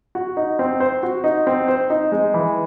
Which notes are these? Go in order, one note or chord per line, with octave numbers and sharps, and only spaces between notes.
F#4
D#4
C4
C5
F#4
D#4
C4
C5
D#4
G#3
E3